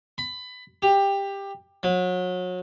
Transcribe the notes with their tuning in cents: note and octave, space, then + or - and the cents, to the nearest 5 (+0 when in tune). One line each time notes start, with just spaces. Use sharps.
B5 +20
G4 +15
F#3 -30